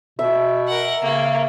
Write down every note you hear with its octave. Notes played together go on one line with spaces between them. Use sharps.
B2 E5
A#4 F#5
C#3 A#3